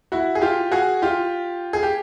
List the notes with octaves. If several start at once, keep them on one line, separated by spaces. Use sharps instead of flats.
E4 F#4
G#4
F4 G4
F#4 G#4
F4 G4
G#4
G4